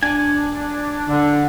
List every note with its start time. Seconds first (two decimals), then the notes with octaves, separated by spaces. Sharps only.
0.03 D4 G#5
1.07 D3